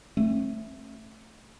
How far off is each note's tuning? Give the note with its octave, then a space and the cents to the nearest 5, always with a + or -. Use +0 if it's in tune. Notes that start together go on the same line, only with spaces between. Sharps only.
A3 +0 C4 +40